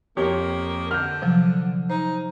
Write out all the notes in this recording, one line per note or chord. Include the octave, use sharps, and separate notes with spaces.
F2 A#3 G4 C#5
D3 F6 G6
C3 F3 F#3
D#4 C5